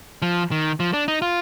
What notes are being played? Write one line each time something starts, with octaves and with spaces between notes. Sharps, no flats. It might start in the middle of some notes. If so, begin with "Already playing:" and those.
F3
D#3
F3
D4
D#4
F4